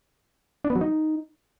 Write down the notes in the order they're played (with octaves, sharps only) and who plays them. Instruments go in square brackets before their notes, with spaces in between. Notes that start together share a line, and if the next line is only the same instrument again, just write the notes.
[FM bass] D4
B3
F#3
D#4